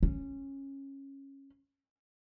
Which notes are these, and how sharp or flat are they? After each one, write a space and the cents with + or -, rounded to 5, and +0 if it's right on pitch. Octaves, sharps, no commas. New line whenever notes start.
C#4 -15